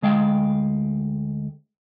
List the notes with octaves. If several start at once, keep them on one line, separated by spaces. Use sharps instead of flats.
D2 G#3 F5 G5